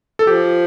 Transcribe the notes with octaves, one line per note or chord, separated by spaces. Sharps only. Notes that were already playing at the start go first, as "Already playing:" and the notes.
A4
F3 G4